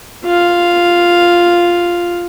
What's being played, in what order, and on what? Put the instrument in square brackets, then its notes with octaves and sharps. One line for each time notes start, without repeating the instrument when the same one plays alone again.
[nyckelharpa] F4 F5